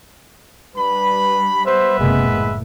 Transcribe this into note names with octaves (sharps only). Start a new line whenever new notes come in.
G3 D4 B4 B5
B3 B4 C5 E5
F#1 C3 G#3 A#3
A2